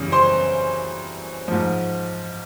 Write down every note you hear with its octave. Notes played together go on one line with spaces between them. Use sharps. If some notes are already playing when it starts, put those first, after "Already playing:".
Already playing: F#2 C#3 E3 G3
C5 C6
G#2 F3